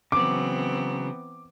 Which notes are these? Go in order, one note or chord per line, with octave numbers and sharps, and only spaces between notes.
C#3 E3 F#3 B3 C4 D6